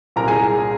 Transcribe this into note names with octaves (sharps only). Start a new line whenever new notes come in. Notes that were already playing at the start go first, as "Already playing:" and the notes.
C2 A#2 A#4 A#5
G#4 G#5